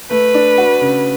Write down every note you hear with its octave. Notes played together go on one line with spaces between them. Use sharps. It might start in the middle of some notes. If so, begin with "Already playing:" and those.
A3 B4
D4
F#4
C#3